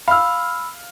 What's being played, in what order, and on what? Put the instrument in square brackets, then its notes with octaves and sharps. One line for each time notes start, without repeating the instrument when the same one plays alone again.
[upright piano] F5 F6 [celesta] B5 E6